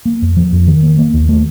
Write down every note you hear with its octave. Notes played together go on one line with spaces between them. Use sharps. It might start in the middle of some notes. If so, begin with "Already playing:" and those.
A#3
F2
F3
F2
D#3
A#3
A#3
D#2
A3